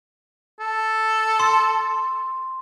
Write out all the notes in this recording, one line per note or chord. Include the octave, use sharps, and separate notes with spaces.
A4
C6